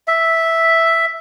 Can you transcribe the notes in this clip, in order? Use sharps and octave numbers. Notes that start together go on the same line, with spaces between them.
E5